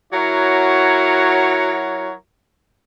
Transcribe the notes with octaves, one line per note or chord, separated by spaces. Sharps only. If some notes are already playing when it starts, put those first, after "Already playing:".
F#3 E4 F#4 A#4 C#5